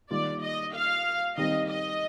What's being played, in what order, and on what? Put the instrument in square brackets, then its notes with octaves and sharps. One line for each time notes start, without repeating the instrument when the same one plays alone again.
[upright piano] D#3 G3 A#3 F4 [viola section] D5
[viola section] D#5
F5
[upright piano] D#3 G3 C4 D#4 [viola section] D#5
[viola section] D#5